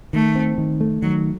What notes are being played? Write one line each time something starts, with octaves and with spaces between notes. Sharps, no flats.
D#3 A3
C4
D#3
A3
D#3 F#3